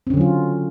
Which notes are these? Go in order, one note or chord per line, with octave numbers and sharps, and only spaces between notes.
D3 F#3 C4 C#4 F4